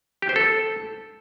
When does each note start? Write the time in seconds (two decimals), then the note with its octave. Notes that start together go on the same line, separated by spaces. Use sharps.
0.22 G4
0.29 C5
0.36 A4